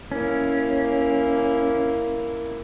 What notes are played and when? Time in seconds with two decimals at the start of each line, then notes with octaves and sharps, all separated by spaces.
0.12 A#3 C#4 E4